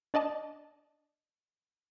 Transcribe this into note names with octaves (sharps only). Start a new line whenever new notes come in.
D4 D5 D#5 A5